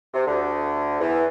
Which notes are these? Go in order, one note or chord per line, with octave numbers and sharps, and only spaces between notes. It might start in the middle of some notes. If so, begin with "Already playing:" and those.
C3
D2 D3
E2 E3